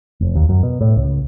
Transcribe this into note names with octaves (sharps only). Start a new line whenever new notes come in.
F1
D#2
F#2
B2
A2
C#2